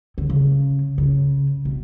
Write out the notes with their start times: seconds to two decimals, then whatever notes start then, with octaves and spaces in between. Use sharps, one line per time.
0.18 D3
0.30 C#3
0.98 C#3
1.65 B2